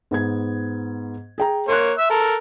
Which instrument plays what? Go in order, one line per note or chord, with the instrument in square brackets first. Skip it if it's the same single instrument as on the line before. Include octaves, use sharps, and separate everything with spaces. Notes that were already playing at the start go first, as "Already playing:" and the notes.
[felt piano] G#2 B3 G#6
G#4 G5 A#5
[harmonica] A#3 C#5 [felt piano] C6 F#6
[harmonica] E5 E6
A4 A#4